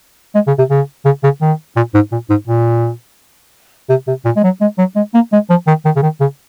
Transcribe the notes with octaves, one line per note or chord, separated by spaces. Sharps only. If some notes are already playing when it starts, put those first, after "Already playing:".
G#3
C#3
C3
C#3
C#3
C#3
D#3
A#2
G#2
A#2
G#2
A#2
C3
C3
A#2
G#3
F#3
G#3
F#3
G#3
A#3
G#3
F3
D#3
D#3
C#3
D#3
C#3